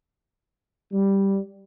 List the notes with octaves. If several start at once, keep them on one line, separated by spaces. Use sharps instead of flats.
G3